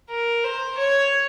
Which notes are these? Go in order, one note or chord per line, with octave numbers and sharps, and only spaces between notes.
A#4
C5
C#5